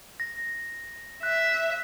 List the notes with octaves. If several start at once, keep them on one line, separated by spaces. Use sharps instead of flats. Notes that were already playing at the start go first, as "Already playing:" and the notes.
A#6
E5 F#6